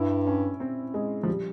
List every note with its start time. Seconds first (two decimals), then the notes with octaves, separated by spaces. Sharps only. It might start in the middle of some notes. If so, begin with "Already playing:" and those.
Already playing: G2 E4
0.27 C#4
0.60 C4
0.94 G#3
1.23 F3
1.28 G3